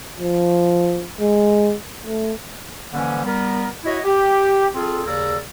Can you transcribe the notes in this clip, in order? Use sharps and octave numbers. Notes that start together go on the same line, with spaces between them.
F3
G#3
A3
D3 E3 F3 G3 A#3 C#4
G3 B3 A#4
E4 F#4 C#5 D#5
G4
C4 F4 G#4 A4
D#2 C#3 G#4 A#4 D5 E6